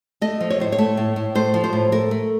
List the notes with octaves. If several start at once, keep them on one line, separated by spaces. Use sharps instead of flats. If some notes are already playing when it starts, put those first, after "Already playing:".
A3 D#5
F3
C#5
A2 C5
C#5
A3
A2
A2
A3 C5
F3
C5
A2
A3 A#4
A3